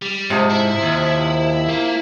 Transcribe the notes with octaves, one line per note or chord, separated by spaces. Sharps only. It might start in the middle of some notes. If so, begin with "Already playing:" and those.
G3
G#2 C3 F3
E4
D#2
A#3